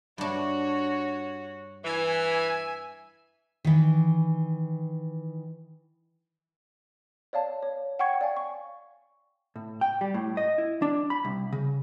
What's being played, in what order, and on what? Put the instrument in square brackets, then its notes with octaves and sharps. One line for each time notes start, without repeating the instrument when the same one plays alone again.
[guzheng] G2 D4 [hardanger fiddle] F#4 C#5
[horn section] E3 [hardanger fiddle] E5 G#5
[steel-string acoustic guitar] D#3 E3
[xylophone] C#5 D5 F5 A5
C#5
F#5 G5 C#6 G#6 C#7
D5 F5 G#5
C#6
[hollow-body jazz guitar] A2
G5
G3
A2
D#5
E4
D4
B5
C2
C#3